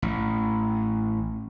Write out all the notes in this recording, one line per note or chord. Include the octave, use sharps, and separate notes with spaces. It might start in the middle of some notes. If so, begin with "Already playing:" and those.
A1